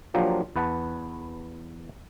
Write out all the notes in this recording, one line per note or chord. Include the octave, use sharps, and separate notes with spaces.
F3 F#3 A#3 D4 F4 G4
E2 B4 F#5 A5